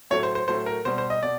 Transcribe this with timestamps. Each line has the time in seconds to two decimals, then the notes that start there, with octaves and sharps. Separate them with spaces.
0.10 A2 F#3 A3 C#5
0.23 C5
0.35 C5
0.48 A2 F#3 A3 C5
0.66 A#4
0.85 B2 G3 C5
0.98 C5
1.10 D#5
1.23 B2 D5